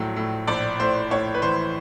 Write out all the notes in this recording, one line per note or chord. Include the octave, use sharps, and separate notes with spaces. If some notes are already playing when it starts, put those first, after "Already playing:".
Already playing: A#1 A2 F#3
A2
A#1 D5
A2 C5
A2 C#5
B4
E3 C5